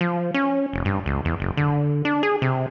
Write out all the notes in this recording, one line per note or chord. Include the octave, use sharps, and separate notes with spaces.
F3
C#4
F1
G2
C#2
E2
F#1
D3
D4
G#4
C3